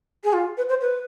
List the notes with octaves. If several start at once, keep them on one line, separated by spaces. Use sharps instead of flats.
G#4
F4
B4
C5
B4